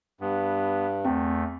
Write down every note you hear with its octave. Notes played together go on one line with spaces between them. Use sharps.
G2 B3
E2 A3 C4 G5